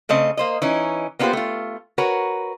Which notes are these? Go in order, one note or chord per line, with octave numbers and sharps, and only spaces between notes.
C#3 A3 C4 D#5
A#3 C5 D#5
E3 C#4 D#4
A#3 B3 D4 F4 G4 C5
A3 F4
F#4 A#4 B4 C#5